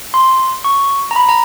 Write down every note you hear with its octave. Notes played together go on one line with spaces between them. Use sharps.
C6
C#6
A#5
B5
A#5